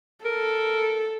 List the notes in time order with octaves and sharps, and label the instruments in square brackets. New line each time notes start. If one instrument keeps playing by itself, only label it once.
[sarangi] A4 [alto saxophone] A#4